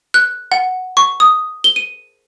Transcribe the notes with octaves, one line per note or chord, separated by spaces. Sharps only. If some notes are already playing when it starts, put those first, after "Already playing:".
F#6
F#5
C#6
D#6
G7
D#7